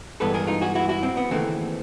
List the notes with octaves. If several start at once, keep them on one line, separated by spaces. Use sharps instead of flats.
G2 E3 G#3 B3 A4 B4
G#4 A#4
D#4 F4
F#4 G#4
E4 F#4
E4 F#4
C4
B3
D#2 C#3 E3 A3 C4